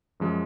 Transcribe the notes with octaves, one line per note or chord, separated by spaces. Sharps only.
F#2 F3 G#3